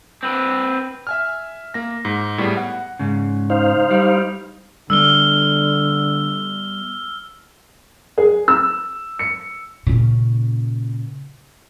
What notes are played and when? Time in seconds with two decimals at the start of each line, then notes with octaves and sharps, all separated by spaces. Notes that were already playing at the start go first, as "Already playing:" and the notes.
0.23 C4 B4
1.07 E5 G#5 F6
1.74 A#3 A#6
2.05 G#2
2.38 A2 G3 B3 G#4
2.57 F#5
2.99 G#2 C#3
3.50 D#4 C5 F5
3.91 G3
4.90 D3 G3 B3 E6 F6 G7
8.18 G#4
8.48 E6
9.19 C#7
9.87 A#2 C#3